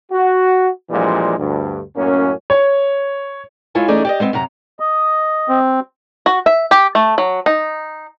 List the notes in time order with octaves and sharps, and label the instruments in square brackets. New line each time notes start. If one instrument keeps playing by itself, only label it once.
[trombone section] F#4
A#1 A#2 E3 F3 G3 G#3
D2 G2
F#2 A2 A#3 C#4
[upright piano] C#5
[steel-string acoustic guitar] G#3 E4 F4 A4 C#5 G#5
E3 A3 C#4 D#4 G#4 D5
G4 D5 D#5
G#3 B3 C4
F#2 C3 A#5
[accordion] D#5
[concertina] C4
[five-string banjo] F#4
E5
G4
A3
F#3
D#4